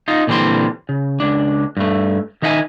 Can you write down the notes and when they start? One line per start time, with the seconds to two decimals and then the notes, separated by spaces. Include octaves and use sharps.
0.08 D#4 F4
0.27 A#2 D3 E3 G3 C4 C6
0.89 C#3
1.20 C#2 D4
1.77 G2 A3
2.42 D#3 D#4 E5 F#5 G#5